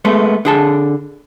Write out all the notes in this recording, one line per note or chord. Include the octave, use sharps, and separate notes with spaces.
G#3 A3 B3
D3 G#4 A5